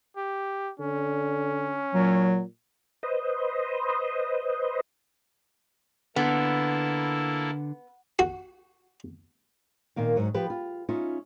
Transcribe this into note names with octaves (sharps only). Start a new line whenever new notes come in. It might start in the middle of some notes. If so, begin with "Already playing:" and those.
G4
D3 C#4
A#2 F#3
B4 C5 D#5
D3 A#3 B3 E4 A4
F#4
A#2 D#3 A#3 F5
G#2 F#3
F3 G4 B4
F4
C#4 D#4 F4 E5